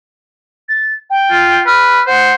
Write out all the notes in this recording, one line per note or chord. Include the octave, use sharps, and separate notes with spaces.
A6
G5
F4
B4 F6
C5 F#5